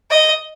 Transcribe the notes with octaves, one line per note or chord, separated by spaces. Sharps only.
D#5